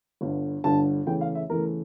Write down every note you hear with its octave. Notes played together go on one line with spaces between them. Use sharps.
G1 G2 D3
G1 G2 D3 A5
E2 C#3 E3 A3 G5
F5
E5
E2 C#3 E3 A3 A#4